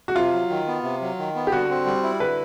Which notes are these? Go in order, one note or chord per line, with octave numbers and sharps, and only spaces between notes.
F#4
C3 F4
F#3
D#3
B3
C3
F#3
D#3
B3
G4
D3 F#4
C4
G3
E4
D3 B4